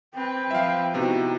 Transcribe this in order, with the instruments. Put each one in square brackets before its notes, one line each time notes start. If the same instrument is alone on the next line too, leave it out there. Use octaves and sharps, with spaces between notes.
[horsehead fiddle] C4 B4 [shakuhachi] G5
[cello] F3 [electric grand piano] E5 F5
[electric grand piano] C3 B3 [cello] D#4 E4 [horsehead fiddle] F#4